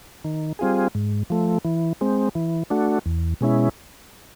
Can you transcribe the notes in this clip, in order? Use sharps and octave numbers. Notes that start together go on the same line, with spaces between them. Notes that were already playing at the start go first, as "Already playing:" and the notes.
D#3
G3 C4 F4 G#4
G#2
F3 A3
E3
G#3 C4
E3
A3 D4 F#4
E2
B2 G#3 C#4 E4